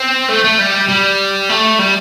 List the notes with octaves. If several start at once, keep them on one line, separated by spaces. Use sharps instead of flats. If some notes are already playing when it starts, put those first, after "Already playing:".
Already playing: C4
A3
A3
G3
G3
A3
G3